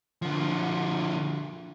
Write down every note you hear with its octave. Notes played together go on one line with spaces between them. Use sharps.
D3 F3